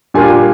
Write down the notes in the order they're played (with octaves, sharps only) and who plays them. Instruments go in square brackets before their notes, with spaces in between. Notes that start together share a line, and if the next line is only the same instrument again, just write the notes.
[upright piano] A#2 G3 A#3 D4 F4 G#5